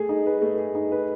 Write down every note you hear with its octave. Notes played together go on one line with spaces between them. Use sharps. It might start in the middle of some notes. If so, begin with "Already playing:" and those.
Already playing: A3 G#4
D#4
B4
A3
G#4
D#4
B4